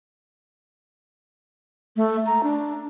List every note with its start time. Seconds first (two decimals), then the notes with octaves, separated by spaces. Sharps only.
1.96 A3
2.26 A#5
2.43 D4